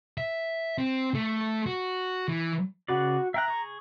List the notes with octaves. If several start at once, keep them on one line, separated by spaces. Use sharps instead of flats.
E5
C4
A3
F#4
E3
C#3 F#4 B4 D5
E5 G5 A#5 F#6
G#4 C#6